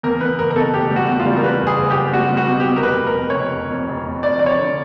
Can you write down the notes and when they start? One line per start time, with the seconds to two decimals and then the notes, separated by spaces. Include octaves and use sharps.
0.03 E2 A#4
0.21 E2 B4
0.39 F#1 A#4
0.50 A#4
0.56 B2 A4
0.73 F#1 G4
0.91 G3
0.96 F#4
1.08 E2
1.20 F4
1.26 G3
1.36 A#4
1.43 G3 B4
1.61 F#1
1.67 G#4
1.78 F#1
1.90 G4
1.96 F#1
2.13 G3 F#4
2.31 G3
2.37 F#4
2.48 B2
2.60 G4
2.66 B2
2.76 A#4
2.83 F1 B4
3.01 F1
3.07 A#4
3.18 F2
3.30 C#5
3.35 F1
3.53 F1
3.71 F2
3.88 F1
4.06 F1
4.23 F2 D5
4.39 F2 D5
4.46 C#5
4.58 D3